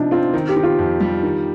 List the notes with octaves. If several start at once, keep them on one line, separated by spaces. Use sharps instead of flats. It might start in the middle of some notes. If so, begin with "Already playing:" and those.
Already playing: C3 F3 D4 D#4
C4 F4
D#3
G4
D#3
F4
F2
G3
D#3